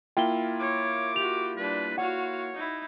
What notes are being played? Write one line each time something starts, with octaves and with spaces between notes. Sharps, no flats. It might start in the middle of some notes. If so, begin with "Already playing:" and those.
A#3 E4 F4 G5 G7
C#5 D6
F#4 G4 F7
G3 D4 B4
F#4 C#5 F5 F#5
D#4 E4